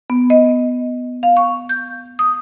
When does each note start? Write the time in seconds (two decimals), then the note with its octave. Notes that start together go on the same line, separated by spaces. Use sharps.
0.10 B3
0.30 D#5
1.23 F5
1.37 C#6
1.69 G6
2.19 D#6